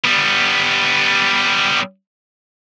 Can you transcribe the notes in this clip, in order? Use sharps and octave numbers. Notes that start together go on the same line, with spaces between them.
G3 B3